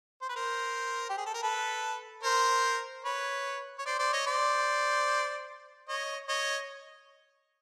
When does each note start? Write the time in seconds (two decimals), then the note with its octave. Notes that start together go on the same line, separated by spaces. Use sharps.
0.22 C5
0.29 B4
0.36 A#4 C5
1.10 G4
1.18 G#4
1.26 A4
1.34 A#4
1.43 A4 B4
2.24 A#4 C5
3.05 B4 C#5
3.79 C#5
3.86 C5 D5
3.99 C5 D5
4.13 C#5 D#5
4.27 C5 D5
5.89 C#5 D#5
6.29 C#5 D#5